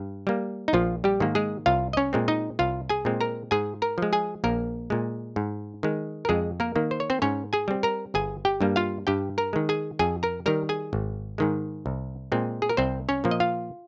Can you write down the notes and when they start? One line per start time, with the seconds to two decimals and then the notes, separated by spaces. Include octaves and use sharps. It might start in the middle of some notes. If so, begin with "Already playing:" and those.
Already playing: G2
0.27 G3 A#3
0.68 D#4
0.73 A#1 F3 F4
1.04 G3 G4
1.20 G#2 D#3 A#3
1.35 G#3 G#4
1.66 C2 F4 F5
1.93 D#5
1.97 C#4 C#5
2.13 A#2 G#3 C4
2.28 D#4 D#5
2.59 C2 F4 F5
2.90 G#4 G#5
3.05 A#2 G#3 C4
3.21 A#4 A#5
3.51 G#2 G#4 G#5
3.82 A#4 A#5
3.98 F3 G#3
4.13 G#4 G#5
4.44 A#1 A#3 A#4
4.90 A#2 G#3
5.36 G#2
5.83 D#3 G#3
6.25 A#4
6.29 F2 G#3 G#4
6.60 A#3 A#4
6.76 D#3 A#3
6.91 C5
7.00 C#5
7.10 C4 C5
7.22 G#2 C#4 C#5
7.53 G#4 G#5
7.68 G3 C4
7.83 A#4 A#5
8.14 G1 G#4 G#5
8.45 G4 G5
8.61 G2 G3 A#3
8.76 F4 F5
9.07 G2 G4 G5
9.38 A#4 A#5
9.53 D#3 G#3
9.69 G#4 G#5
9.99 F2 G#4 G#5
10.23 A#4 A#5
10.46 D#3 G3 A#4 A#5
10.69 G#4 G#5
10.93 G#1
11.38 G#2 D#3 G#3
11.86 C2
12.32 A#2 G#3 C4
12.62 G#4
12.69 A#4
12.77 C2 C4 C5
13.09 C#4 C#5
13.24 A#2 F3 A#3
13.31 D#5
13.40 F4 F5